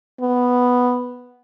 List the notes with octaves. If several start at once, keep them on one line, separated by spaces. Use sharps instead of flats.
B3